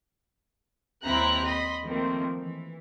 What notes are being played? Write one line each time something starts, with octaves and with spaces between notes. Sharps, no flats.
D#2 G3 C4 E4 A#5 F#6
D#5 B5 C6
D#3 F3 A3 A#3 C4
E3